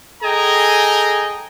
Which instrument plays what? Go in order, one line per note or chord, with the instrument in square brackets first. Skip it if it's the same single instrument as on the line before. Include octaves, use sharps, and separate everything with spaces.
[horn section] G#4 A4 D#5 G5 G#5 A#5